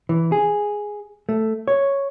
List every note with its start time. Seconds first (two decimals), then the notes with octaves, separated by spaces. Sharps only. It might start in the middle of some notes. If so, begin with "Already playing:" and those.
0.09 E3
0.32 G#4
1.29 A3
1.68 C#5